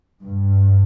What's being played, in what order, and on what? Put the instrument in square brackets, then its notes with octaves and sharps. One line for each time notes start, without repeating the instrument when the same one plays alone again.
[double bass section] G2